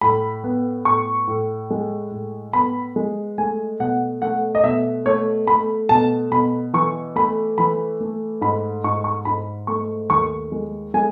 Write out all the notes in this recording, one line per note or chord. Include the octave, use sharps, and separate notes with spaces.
A2 B5
B3
A2 C#6
A2
G#3
A2
B3 B5
G#3
A3 G#5
B2 F#5
A3 F#5
D#5
B2 E5
A3 C#5
A3 B5
B2 A5
B2 B5
E3 C#6
A3 B5
E3 B5
A3
G#2 B5
G#2 C#6
C#6
G#2 B5
A3 C#6
D#2 C#6
G#3
G#3 G#5